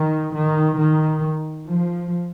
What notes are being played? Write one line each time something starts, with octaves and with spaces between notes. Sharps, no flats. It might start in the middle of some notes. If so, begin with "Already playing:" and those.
Already playing: D#3
D#3
D#3
F3